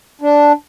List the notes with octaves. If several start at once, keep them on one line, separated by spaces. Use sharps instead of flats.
D4